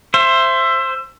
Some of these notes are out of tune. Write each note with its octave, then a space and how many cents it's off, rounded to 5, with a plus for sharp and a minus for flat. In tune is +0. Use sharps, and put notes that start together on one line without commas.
C5 +10 E5 +25